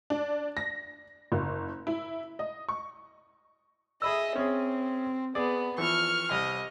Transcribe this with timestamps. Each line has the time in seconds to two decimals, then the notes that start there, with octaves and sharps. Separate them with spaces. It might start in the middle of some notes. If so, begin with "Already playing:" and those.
0.10 D4
0.57 A#6
1.32 F#1
1.87 E4
2.39 D#5
2.69 C#6
4.02 G#4 D#5 E5 B5 E6
4.36 C4 C#4 G#4
5.35 B3 G#4 D5
5.78 E3 F3 C#6 F6
6.31 C2 D#5 F6